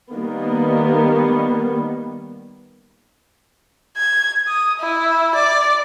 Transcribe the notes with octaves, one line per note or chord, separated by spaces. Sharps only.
D#3 G3 A#3 B3
G#6
D#6
E4
D5